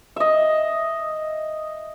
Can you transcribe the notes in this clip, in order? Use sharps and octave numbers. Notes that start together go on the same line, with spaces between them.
D#5 E5